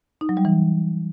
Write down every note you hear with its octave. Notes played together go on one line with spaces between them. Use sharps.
D#4
F#3
G3
E3